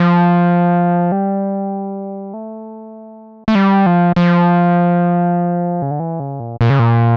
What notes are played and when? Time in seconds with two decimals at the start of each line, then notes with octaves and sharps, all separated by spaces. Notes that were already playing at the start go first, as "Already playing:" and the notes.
Already playing: F3
1.12 G3
2.34 A3
3.48 A3
3.55 G3
3.86 F3
4.16 F3
5.82 C#3
5.91 D3
6.00 E3
6.20 C#3
6.40 A#2
6.61 A#2
6.70 C#3
6.79 A#2